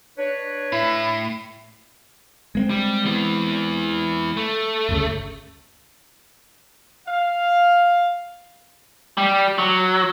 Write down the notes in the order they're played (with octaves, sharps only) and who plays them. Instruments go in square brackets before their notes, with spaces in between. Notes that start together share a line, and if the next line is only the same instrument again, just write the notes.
[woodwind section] D4 B4 C#5
[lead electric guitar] A2 [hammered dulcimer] E4
[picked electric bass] G#3 A#3 C4
[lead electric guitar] G3
E3 B3
A3
[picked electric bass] G1 D2 C#3
[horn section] F5
[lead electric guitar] G3
F#3